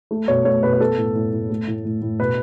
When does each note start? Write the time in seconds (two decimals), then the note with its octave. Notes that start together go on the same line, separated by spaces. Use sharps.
0.11 A3
0.28 B2 C#5
0.45 A3 C#5
0.63 B2 B4
0.73 B4
0.80 B3 A4
0.98 A2
1.15 A2
1.32 A2
1.50 A3
1.67 A2
1.85 A2
2.02 A2
2.19 B2 B4